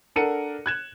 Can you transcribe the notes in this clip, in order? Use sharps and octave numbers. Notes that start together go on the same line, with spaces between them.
D4 A4 A#4 F#5 C#7 D#7
F#6 G#6 E7